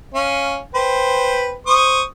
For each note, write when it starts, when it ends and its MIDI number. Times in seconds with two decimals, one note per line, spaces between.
0.14 0.59 61
0.14 0.59 77
0.75 1.54 71
0.75 1.54 72
0.75 1.54 79
1.67 2.02 72
1.67 2.02 85
1.67 2.02 87